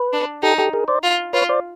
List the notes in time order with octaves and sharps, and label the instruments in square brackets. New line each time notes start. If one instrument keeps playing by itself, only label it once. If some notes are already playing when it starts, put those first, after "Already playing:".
Already playing: [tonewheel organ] B4
[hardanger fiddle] D4
[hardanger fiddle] D#4 [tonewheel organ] G4 A4
[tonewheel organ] G4 A4
G#4 A#4
C5 D5
[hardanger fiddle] F4
[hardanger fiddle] F4 [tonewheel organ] B4 C#5
[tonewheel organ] C5 D5